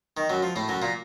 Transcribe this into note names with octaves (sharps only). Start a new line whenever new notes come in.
D#3
F#2 F#3
F3
A2 A3
F#2 F#3
A#2 A#3